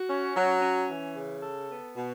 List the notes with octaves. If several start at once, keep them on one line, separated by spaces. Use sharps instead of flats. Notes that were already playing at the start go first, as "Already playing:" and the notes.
Already playing: F#4
C#4
F#3
C#4
E3
C#3
A4
B3
B2